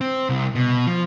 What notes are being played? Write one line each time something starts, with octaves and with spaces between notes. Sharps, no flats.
C4
C2
B2
F3